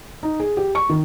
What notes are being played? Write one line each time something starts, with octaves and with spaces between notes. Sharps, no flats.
D#4
G#4
G4
C#6
D#3